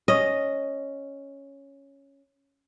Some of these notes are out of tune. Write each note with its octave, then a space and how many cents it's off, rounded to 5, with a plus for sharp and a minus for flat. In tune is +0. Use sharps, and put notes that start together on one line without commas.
C#4 +0 D#5 +0